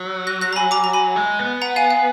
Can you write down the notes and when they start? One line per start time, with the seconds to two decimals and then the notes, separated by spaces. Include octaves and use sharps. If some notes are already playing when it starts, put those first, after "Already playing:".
Already playing: F#3
0.27 F#6 A#6
0.41 F#6 A#6
0.53 A#5
0.56 G#5 B5
0.71 A#5 D6
0.84 A#5
0.93 G#5 B5
1.16 G#3
1.39 B3
1.62 F#5 A#5
1.76 F5 G#5
1.90 F5